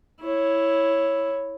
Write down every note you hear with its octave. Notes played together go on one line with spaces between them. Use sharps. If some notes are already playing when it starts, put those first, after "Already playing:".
E4 C#5